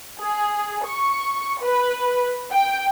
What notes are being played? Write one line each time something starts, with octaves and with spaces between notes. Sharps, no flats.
G#4
C#6
B4
G5